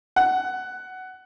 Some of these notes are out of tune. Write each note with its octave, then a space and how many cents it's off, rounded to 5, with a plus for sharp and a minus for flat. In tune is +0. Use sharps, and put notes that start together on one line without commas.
F#5 +15